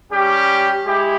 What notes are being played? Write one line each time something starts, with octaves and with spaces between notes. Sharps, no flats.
G3 C#4 G4
G#3 E4 G4